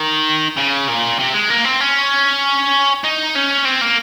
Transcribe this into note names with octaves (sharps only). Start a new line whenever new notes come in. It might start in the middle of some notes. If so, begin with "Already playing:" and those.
Already playing: D#3
C#3
A#2
C3
G#3
A#3
C4
C#4
D#4
C#4
C4
A#3